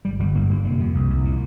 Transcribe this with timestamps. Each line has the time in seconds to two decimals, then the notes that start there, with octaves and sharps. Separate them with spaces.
0.05 G1 G3
0.19 G1 G3
0.35 G2 A#3
0.50 G1 A#3
0.64 C3
0.80 F2
0.95 C2
1.10 C2
1.25 A#2